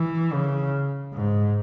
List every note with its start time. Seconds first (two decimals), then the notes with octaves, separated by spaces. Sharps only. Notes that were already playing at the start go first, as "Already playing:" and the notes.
Already playing: E3
0.33 C#3
1.14 G#2